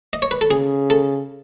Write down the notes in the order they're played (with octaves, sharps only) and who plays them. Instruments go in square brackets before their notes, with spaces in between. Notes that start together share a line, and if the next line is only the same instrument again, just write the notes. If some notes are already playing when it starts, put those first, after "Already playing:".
[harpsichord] D#5
C#5
B4
A4
[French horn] C#3 [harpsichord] G#4
[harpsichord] A4